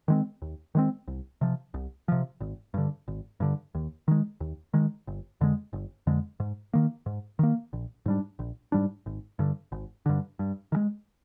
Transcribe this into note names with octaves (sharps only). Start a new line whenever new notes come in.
D#3 G#3 C4
D#2
D#3 G#3 C4
C2
C3 F3
C2
C3 F3
G#1
G2 D3
G#1
G2 D3
D#2
D#3 G#3
D#2
D#3 G#3
G1
F2 D3 G#3
G1
F2 D3 G#3
G#2
D#3 A#3
G#2
D#3 A#3
A#1
G#2 G3 D4
A#1
G#2 G3 D4
G#1
G2 D3
G#1
G2 D3
G2
D#3
G#3